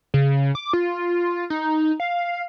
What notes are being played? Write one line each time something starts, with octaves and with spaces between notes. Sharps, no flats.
C#3
D6
F4
D#4
F5